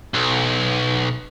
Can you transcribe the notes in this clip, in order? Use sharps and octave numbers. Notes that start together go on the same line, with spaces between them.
B1